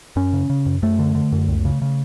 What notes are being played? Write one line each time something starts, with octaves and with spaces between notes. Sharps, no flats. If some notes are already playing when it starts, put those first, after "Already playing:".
F#2 C#4
C#3
C#3
F#2
F#2 A3
D3
D3
F#2
C#2
C#3
C#3